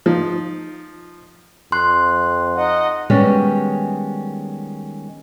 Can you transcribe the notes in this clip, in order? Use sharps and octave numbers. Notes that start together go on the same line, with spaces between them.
F3 D#4
F2 C6 F#6
D#4 D#5 F#5
D#3 G3 G#3 B3 C#4